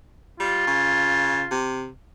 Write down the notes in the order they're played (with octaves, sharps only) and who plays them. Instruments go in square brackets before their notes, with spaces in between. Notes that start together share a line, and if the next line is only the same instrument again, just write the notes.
[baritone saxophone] G3 [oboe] F4
[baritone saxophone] C#3
C3